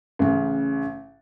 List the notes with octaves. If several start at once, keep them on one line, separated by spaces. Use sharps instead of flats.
A1 C#3